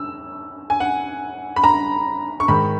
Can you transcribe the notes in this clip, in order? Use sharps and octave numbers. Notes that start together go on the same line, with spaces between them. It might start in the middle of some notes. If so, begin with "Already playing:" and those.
Already playing: E6
G#5
F#5
B5
A#5
C#6
G#2 D#3 G#3 B5